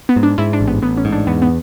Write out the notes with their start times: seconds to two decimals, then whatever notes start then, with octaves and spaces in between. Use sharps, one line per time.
0.09 B3
0.16 G#2
0.23 D4
0.38 G#2 E4
0.53 D4
0.61 A1
0.68 B3
0.82 A1 B3
0.97 C#4
1.05 G#2
1.12 D4
1.27 E2 B3
1.42 B3